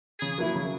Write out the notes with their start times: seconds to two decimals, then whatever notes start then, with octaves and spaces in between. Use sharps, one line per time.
0.21 C#3 G#4
0.38 F#3 A#3 E4
0.55 C#3